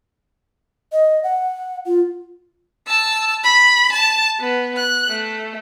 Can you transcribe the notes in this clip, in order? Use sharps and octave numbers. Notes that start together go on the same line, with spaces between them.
D#5
F#5
F4
A5 E6
B5
A5
B3
F#6
A3